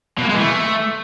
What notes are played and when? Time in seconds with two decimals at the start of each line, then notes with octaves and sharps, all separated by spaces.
0.18 B2
0.23 A#3
0.29 G#3
0.34 E3
0.40 A3